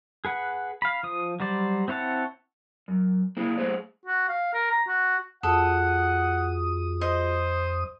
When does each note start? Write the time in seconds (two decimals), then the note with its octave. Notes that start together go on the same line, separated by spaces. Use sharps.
0.25 G#4 B4 F#5
0.82 F5 B5
1.03 F3 D#6
1.40 F#3 G3 C5 D5
1.88 C4 E4 C#5 F#5 A5
2.88 F#2
3.37 A#3 E4 G#4
3.57 A3 G#4 C5 C#5
4.06 F#4
4.29 F5
4.54 A#4
4.71 A#5
4.88 F#4
5.43 F2 F4 F#4 G#4 A4 F#5 D#6
7.01 C5 D#5